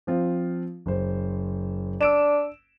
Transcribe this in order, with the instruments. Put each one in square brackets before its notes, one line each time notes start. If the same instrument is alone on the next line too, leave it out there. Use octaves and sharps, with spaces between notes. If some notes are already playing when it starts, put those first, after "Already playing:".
[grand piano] F3 C4 F4
F#1 C5
[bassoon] D4 [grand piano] E6 D7 E7